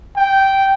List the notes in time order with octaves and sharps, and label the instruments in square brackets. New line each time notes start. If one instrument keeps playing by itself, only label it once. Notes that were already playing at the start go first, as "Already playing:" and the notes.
[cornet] G5